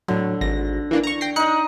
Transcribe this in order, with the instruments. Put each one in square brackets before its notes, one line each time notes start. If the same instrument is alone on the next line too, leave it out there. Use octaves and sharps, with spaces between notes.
[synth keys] A2 F#3 [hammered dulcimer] D3
[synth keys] G#1 A#6
E3 A#3 D4
A#5 C#6
G5 A#6 C7
[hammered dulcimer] D#4 D#5 [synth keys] F#6 C#7